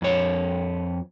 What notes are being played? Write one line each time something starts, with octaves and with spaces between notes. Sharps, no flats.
F2 C#5